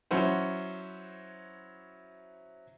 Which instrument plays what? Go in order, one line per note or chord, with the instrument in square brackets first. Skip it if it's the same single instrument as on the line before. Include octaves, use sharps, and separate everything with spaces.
[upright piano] F#3 C#4 E4 C5 F#5